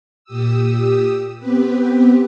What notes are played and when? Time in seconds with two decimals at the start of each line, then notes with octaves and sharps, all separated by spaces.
0.24 A#2 G4 D#6 E6
1.38 B3 C4 G4 B4